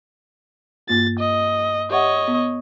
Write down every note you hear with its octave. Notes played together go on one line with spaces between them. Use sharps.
G2 A#3 F4 A6
D#5
G4 C#5 D#5 E5 F#5
B3